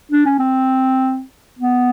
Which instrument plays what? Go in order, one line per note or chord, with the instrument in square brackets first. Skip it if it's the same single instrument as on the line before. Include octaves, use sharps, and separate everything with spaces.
[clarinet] D4
C#4
C4
B3